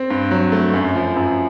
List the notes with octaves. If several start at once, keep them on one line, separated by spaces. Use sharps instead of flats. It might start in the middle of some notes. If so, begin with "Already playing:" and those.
Already playing: C4
G2
F#3
A3
F#2
F3
F#2